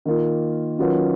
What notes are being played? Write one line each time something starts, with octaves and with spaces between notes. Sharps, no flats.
D#3 A#3 F4
D#3 F#3 C#4 F4 B4